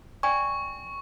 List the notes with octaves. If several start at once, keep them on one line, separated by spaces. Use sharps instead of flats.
D5 G5 G#5 C#6